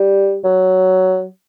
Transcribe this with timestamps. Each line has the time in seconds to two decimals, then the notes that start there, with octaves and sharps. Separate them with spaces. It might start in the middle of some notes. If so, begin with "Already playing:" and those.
Already playing: G3
0.44 F#3